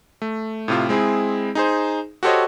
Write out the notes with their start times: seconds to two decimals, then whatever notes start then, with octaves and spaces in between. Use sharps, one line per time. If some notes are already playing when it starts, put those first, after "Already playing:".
0.22 A3
0.68 A2 C3 F4
0.89 G#3 C4 E4 G#4
1.55 D#4 G#4 C5
2.23 F#4 G4 A4 C5 C#5 D#5